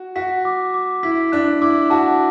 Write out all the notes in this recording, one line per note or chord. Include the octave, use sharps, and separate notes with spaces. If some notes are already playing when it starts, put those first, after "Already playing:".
Already playing: F#4
F#4 B6
D6
D6
E4 B6
D4 F#6
E4 D6
F#4 A5